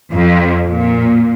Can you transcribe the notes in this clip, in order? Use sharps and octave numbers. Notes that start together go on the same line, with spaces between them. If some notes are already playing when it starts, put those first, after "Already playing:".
F2
A#2